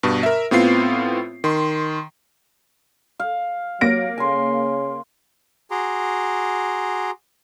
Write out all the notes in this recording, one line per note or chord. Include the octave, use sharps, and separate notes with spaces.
G2 B2
A#4 E5
A2 B3 C4 F4 C7
D#3 C6
F5
F#3 A#3 A#6 D7
C#3 G#5 C6
F#4 G#4 A#5 C6 D6